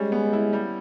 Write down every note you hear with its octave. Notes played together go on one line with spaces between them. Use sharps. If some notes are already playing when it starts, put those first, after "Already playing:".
Already playing: G3 G#3 C#4
B3
E4
G3